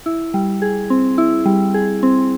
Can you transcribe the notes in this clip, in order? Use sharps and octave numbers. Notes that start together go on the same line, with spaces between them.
E4
G3
G#4
C4
E4
G3
G#4
C4